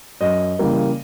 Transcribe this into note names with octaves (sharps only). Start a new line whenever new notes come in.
F#2 D#5
C#3 E3 G3 A#3